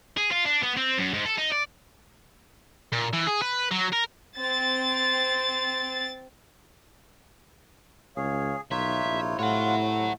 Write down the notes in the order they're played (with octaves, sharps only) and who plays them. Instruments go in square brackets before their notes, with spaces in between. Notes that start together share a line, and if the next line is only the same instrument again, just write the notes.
[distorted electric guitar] G#4
F4
D4
B3
C4
F#2
G#2
A4
D#4
D5
A#2
E3
G#4
B4
F#3
A#4
[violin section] C4 A6
[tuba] C#2 [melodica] G#4 [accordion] C#5 F5
[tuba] B1 [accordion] D#3 [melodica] D#4 F4 C#5 [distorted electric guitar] E5
[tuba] A#1 [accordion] C3 E4
[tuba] A2 [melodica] F4 F#4 [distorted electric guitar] C#5 F#5
[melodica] A3